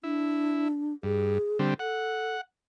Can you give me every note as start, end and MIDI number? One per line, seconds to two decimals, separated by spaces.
0.03 0.93 62
0.03 0.68 64
1.03 1.38 43
1.03 1.58 68
1.59 1.74 50
1.59 1.74 55
1.59 1.74 60
1.79 2.36 69
1.79 2.41 78